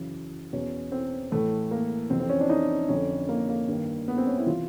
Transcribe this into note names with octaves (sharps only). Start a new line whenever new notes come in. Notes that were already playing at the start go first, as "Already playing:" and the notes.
Already playing: F#2 C#3 E3
E2 B2 C#4
C4
A2 E3 A3
A#3
F2 C3 E3 C4
C4
C#4
D4
D#4
F2 D3 C#4
A#3
A#3
G2 D#3
B3
C4
C#4
E4
C3 E3 F4